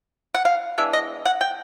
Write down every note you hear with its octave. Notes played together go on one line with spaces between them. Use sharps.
F#5
F5
E3 G#3 B3 D4 E5
D#5
F#5
G5